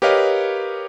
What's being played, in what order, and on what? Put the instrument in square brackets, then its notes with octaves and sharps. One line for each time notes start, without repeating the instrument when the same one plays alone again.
[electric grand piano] G4 A#4 B4 C#5 D#5 F5